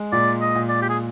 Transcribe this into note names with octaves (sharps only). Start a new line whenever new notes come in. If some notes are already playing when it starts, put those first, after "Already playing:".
Already playing: G#3
A#2 D5
D#5
A#2
D5
G4
G#4